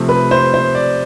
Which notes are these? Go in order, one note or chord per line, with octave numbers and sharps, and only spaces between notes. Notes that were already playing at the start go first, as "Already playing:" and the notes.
Already playing: C3 F3 A3
B4
C5
C5
D5